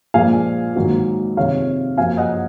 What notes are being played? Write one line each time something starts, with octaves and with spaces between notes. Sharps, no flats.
A#1 A#2 F3 G#3 F5 G#5
G#1 G#2 D#3 F#3 A#3
F2 C3 D#3 G#3 C#5 F5
F#2 F3 A#3 F5 G#5
D#5 F#5